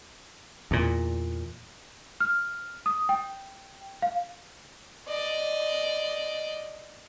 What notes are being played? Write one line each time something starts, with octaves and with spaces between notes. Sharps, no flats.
E2 A#2
F6
D#6
G5
F5
D5 D#5